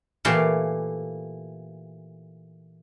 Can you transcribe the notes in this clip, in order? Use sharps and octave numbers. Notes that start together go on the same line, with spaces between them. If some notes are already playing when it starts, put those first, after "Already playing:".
A#2 E3 A3 G4 C#5 F5